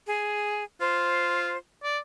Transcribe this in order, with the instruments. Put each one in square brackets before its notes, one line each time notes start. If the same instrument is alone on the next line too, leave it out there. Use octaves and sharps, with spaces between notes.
[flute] G#4
[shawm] F4 [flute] C5
[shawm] D5